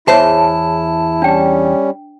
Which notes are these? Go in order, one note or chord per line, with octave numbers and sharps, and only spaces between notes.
E2 E4 G#4 C5 C#5 E5 A5
G3 C#4 D4 G5